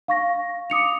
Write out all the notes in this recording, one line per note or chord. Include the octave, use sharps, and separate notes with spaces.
F5 C#6 A#6
D6 D#6 C#7 F7